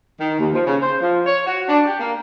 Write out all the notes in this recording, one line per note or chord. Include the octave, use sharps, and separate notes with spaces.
D#3
D#2
F3
C#3
C5
F3
C#5
F#4
D4
G4
A#3